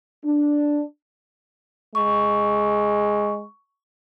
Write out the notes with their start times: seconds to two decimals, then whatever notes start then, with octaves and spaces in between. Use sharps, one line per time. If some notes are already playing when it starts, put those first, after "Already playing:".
0.24 D4
1.95 G#3 C#6